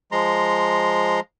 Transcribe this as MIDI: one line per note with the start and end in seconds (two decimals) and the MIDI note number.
0.12 1.20 53
0.12 1.20 56
0.12 1.20 82
0.12 1.20 84